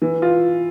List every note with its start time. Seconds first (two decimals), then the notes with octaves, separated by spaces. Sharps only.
0.02 E3
0.22 F4